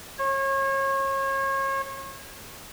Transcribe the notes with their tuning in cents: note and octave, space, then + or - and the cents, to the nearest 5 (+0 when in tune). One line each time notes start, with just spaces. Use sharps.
C#5 -35